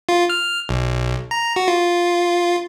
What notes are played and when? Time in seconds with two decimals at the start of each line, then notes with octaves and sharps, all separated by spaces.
0.09 F4
0.30 F6
0.69 B1
1.31 A#5
1.56 F#4
1.68 F4